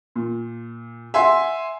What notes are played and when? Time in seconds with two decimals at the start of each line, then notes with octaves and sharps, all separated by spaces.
0.16 A#2
1.14 E5 F#5 G#5 C6